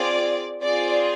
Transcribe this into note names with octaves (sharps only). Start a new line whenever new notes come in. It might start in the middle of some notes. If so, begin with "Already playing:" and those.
Already playing: C4 F4 G#4 D5
C4 F4 G#4 D5